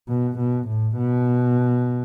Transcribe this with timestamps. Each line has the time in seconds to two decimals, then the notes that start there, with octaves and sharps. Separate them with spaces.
0.09 B2
0.38 B2
0.68 A2
0.97 B2